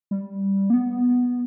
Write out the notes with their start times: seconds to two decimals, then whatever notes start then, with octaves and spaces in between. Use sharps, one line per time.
0.11 G3
0.70 A#3
0.74 B3